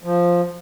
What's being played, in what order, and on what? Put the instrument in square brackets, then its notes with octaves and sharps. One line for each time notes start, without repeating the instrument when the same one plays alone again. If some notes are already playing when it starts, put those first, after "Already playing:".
[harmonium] F3